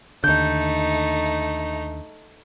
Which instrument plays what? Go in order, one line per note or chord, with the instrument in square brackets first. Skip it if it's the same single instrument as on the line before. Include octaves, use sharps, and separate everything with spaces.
[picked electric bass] D#2 D3 [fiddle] A3 D#4 [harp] G6